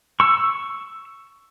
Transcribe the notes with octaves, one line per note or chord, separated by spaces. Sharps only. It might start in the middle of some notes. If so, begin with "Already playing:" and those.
C#6 E6